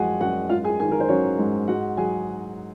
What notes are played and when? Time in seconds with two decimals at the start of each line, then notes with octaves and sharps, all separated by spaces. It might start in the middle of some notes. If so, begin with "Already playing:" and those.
Already playing: F#2 F3 G#3 F#4 G#4 F#5 G#5
0.20 F#2 F#4 F#5
0.49 G#2 F4 F5
0.64 G#4 G#5
0.80 D#3 G#4 G#5
0.91 A#4
1.00 C5
1.08 F#3 C#4 C#5
1.38 G#2
1.68 G#2 F#4 F#5
1.97 F#3 G#4 G#5